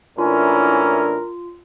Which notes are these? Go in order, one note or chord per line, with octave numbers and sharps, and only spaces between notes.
A2 E3 A#3 C#4 D4 E4 F4 A#4